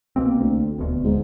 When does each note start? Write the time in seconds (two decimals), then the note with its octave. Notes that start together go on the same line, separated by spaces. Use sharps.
0.16 C2 B2 A#3 C4
0.39 D2
0.78 D#1 D2 B2
1.04 G#2